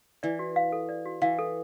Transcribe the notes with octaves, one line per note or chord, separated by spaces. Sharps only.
E3 D5
F#4
F5
A4
D5
F#4
E3 F5
A4